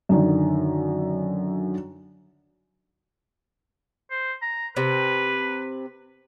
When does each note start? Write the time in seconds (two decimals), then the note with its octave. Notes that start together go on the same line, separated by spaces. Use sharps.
0.09 F#2 D3 D#3
4.10 C5
4.42 A#5
4.77 C3 B4